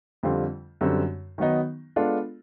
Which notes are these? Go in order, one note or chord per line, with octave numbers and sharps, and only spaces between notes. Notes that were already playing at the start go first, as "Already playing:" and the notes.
F2 D3 G3 C4 F4
F#2 D3 G3 C4
D#3 F#3 B3 D#4
G#3 B3 D4 F4 A4